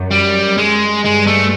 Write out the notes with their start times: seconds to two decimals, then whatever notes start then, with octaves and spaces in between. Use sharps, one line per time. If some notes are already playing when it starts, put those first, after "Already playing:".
Already playing: F#2
0.11 G3
0.57 G#3
1.04 G2 G#3
1.27 A3